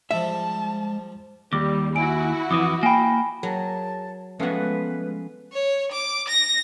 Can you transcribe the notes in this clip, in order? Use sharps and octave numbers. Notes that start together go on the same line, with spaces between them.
F3 G3 G#3 E5 A5
D#2 G3 D6
E4 F#4 G#5 D7
F2 E3 D6 D#6
A#3 G5 G#5 B5
F#3 G#4 A#4 A5
F3 G#3 A3 B3 C#4 F#4 B4 F5
C#5
D6
A#6